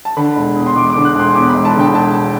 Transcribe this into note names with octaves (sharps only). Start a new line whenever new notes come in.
A5
D3 B5
E1
E2
C6
E1 D6
D6
D3
F#6
E1 C6
E2 D6
B5
E1
A5
D3 G5
E1 A5